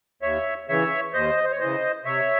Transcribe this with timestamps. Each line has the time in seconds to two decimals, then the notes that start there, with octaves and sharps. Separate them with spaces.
0.22 D#2 C#5 E5
0.68 C#3 E3 C#5 E5
1.13 D#2 C5 D#5
1.44 C5
1.52 C#5
1.60 C#3 E3 C5 D#5
2.05 C3 C#5 E5